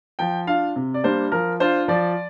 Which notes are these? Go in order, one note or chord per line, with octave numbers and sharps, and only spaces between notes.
F3 G5
D4 F4 F5
C3
D5
G3 A#3 D4 C5
F3 A#4
D4 F4 C5
F3 D5